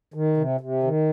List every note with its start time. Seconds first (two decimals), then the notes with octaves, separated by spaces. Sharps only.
0.14 D#3
0.37 C3
0.61 C3
0.83 D#3